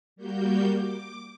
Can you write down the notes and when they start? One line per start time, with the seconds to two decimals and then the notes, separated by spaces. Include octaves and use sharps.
0.16 G3 A#3 F#4 G4 G6
0.68 D6